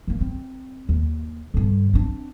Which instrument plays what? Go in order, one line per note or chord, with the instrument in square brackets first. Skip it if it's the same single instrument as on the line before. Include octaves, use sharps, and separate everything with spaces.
[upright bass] D#3 A#3
C4
D#2
G2 D3
C4 D4